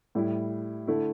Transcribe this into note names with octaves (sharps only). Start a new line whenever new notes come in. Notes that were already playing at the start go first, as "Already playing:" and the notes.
A2 G3 E4
D3 A3 E4